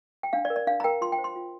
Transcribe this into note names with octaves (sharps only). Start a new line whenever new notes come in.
G5
D4 F5
D5
A#4
D5
D4 F5
A#5
A#4 G5
F4 C6
G5
C5
C6
F4